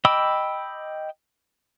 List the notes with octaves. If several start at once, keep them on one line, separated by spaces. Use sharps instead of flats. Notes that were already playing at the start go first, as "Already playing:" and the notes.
D#5 G5 B5 D6 E6